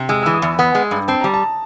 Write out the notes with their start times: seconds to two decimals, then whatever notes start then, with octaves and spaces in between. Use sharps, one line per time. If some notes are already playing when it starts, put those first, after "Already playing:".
Already playing: C3
0.09 G#3 E6
0.23 E3 E6
0.34 D#6
0.42 E2
0.59 B3 D#6
0.75 G#3
0.91 G2
1.08 C4 A5
1.21 G3 A#5
1.34 A5